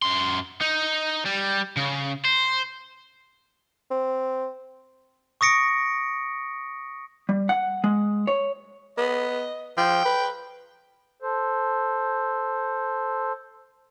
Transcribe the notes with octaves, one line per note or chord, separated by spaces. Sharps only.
F#2 C6
D#4
G3
C#3
C5
C4
C#6 D#6 A#6 C#7 D7
G3
F#5
G#3
C#5
B3 D#5
F3 G5
B4
A4 C5